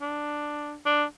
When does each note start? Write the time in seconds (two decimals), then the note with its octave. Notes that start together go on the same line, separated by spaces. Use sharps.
0.01 D4
0.85 D4